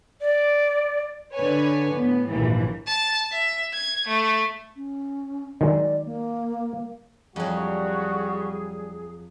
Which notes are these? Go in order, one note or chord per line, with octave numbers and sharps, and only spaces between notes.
D5
D3 B4 C#5 G#5
A2 B3
A#1 D#2 G#2 E3
A5
E5
G#6
A3
C#4
D#3 F#3 G#3 D5
A#3
F2 F#3 G3 F#4 G#4